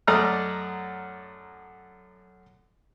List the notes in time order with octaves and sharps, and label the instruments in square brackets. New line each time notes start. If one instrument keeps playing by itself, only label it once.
[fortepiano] F#2 A3 D5 D#5 A#5 F6